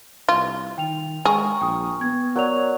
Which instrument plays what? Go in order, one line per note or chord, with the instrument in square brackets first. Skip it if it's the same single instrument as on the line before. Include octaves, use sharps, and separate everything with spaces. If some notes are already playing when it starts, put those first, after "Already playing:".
[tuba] C2 [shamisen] F4
[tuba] D#3 [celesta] G5 F7
[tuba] G#3 [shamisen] G#4 [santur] A#4 C#6
[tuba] A#1 [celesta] G5 D#6
[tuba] B3 [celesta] G#6
[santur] F#3 [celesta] A#4 D5 F7